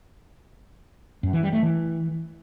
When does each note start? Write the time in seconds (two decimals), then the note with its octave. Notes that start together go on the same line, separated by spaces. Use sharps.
1.23 F#2
1.33 E3
1.43 G3
1.53 A3
1.63 E3